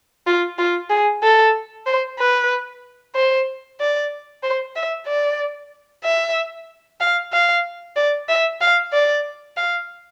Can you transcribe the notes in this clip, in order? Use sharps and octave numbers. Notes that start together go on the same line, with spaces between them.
F4
F4
G#4
A4
C5
B4
C5
D5
C5
E5
D5
E5
F5
F5
D5
E5
F5
D5
F5